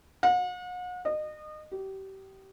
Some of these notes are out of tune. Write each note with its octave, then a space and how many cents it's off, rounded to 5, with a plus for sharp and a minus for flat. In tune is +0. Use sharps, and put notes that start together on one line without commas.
F#5 -40
D#5 -30
G4 -30